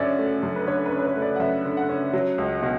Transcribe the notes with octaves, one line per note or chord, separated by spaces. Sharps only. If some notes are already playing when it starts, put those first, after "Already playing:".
Already playing: F#2 D3 C#4 D5 E5
A3
F#2
B4
D3 C#5
B4
C#4
B4
C#5
A3
D5
F#5
F#2 E5
D3
F#5
C#4
F#3
C#2
B2